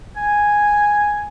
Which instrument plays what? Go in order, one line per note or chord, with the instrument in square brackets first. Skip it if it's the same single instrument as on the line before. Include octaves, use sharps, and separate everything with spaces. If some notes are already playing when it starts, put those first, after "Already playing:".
[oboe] G#5